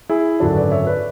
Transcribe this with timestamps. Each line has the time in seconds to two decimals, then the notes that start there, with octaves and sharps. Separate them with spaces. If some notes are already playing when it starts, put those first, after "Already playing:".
0.09 E4 G#4
0.40 G#1 F#2 D3 D4 F#4
0.56 B4 D5
0.71 C#5 E5
0.86 B4 D5